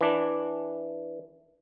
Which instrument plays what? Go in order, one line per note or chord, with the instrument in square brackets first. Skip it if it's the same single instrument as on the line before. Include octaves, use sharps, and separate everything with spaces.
[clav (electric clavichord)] E3 D4